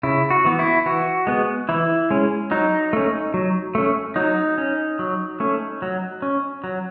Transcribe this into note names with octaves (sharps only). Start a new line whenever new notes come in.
C#3 E4
F#4
E3 B3
E4
E3 F#4
G#3 B3
E3 E4
G#3 C#4
F#3 D#4
A3 C#4
F#3
A3 C#4
F#3 D#4
C#4
F#3
A3 C#4
F#3
C#4
F#3